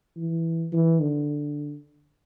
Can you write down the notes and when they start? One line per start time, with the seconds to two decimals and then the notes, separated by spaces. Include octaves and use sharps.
0.17 E3
0.73 E3
1.01 D3